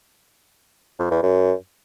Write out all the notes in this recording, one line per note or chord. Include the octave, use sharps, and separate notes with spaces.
F2
E2
F#2